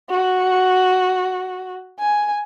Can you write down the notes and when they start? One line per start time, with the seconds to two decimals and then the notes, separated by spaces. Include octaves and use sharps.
0.10 F#4
1.99 G#5